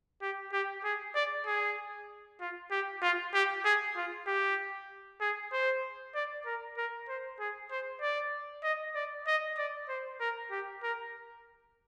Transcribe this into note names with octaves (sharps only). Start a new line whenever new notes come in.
G4
G4
G#4
D5
G#4
F4
G4
F4
G4
G#4
F4
G4
G#4
C5
D5
A#4
A#4
C5
G#4
C5
D5
D#5
D5
D#5
D5
C5
A#4
G4
A#4